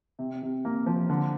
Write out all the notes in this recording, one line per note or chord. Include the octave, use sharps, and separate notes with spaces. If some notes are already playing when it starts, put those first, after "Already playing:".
C3
C3
A#3
F3
D3